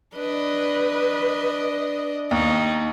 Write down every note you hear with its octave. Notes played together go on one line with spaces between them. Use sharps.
D4 B4 D#5
D#2 D#4